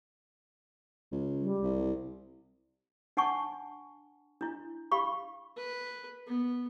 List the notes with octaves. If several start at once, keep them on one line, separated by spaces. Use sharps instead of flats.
C#2
G3
C2
D4 F#5 G#5 A5 C#6
D4 E4
G4 F5 B5 C#6
B4
B3